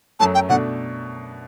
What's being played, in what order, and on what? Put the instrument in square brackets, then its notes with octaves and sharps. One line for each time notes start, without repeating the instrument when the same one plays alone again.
[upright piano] F#2 F#3 A3 [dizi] A5
[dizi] G5
[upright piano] B2 A3 D4 [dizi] F#5